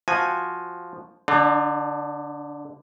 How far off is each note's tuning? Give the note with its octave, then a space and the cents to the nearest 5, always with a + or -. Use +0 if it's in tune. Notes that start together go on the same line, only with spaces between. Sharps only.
F3 +0 F#4 +0 G#5 +0
D3 -10 D4 +45